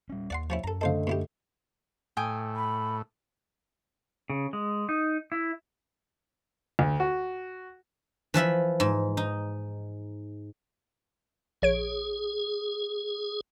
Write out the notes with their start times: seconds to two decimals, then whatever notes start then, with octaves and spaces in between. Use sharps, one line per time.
0.09 G3 C#4
0.30 D#2 D5 F#5 C6
0.50 F3 C#4 E4
0.64 F#2 A4 A#5
0.81 D3 A3 A4 C5 D#5 F5
1.07 B2 E4 G4
2.17 A2 G5 G#5 D#6
2.56 B5
4.30 C#3
4.53 G#3
4.89 D#4
5.32 E4
6.79 D2
7.00 F#4
8.34 E3 F3 E5 B5
8.80 G#2
9.17 D#4
11.62 A#1 G#4 C#5 D7